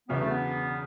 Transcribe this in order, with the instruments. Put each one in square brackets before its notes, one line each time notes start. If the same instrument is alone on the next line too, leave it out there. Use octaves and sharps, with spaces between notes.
[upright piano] E1 E2 C#3 F#3 C#4 [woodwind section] B3
[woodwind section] A3
B3